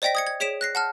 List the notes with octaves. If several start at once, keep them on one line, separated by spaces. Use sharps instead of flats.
C5 D5 D#5 G5 A#6 B6
D#6 G#6 C#7
G#6
G#4 C#5 B6 D7 E7
F#6 A#6 C7
F#5 A5 F6